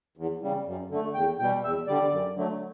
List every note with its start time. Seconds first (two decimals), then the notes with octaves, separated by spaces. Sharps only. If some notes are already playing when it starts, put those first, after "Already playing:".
0.17 E2
0.42 C#3 G3
0.66 F#2
0.90 D3 A3
1.14 E2 G5
1.39 B2 G3 G5
1.64 E2 E5
1.87 D3 G3 D5
2.11 F#2
2.36 D3 F#3 A3